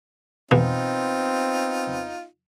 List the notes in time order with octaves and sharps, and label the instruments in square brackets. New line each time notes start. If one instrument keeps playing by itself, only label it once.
[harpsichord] G#2 E3 G#3 [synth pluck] B2 [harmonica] B3 D#4 F4 [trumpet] C4